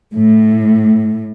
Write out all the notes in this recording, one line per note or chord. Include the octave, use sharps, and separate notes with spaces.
A2